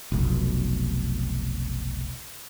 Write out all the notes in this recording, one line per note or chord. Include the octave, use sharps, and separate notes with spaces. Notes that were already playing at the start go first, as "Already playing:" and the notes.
F1 B1